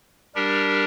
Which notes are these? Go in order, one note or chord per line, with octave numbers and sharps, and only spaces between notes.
G3 D4 G4 A#4